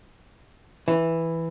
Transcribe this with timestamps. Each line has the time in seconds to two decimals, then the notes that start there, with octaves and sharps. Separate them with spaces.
0.88 E3